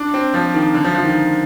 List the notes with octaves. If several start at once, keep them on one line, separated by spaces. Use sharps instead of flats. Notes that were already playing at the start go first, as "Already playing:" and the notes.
Already playing: D4
C4
F3
D#3
D3
F3
F3
D#3